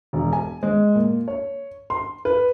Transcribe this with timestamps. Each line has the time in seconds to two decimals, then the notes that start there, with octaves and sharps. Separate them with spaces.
0.13 E1
0.33 G#5
0.63 G#3
0.95 A#2
1.28 C#5
1.90 C6
2.25 B4